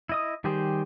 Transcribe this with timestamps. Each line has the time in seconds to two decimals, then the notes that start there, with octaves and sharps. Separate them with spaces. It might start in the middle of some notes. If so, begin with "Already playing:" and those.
0.09 E4 D#5 D#6
0.44 D#3 G3 G4 G#4 C5